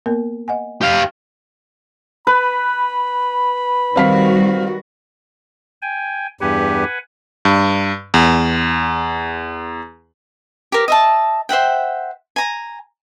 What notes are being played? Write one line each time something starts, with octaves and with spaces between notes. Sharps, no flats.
A#3 B3 A#4
D#5 F#5 G#5
G4 F5
B4 B5
D#3 G3 C4 F#4 F5 B6
G5 G#5
E2 G2 G4 B4 F#5 G#5
G2
E2
G4 A#4
D#5 E5 A5
C5 E5 F#5 G5
G#5 A#5